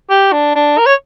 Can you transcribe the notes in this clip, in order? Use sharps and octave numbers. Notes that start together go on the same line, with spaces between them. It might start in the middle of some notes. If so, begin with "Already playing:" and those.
G4
D4
D4
A#4
C#5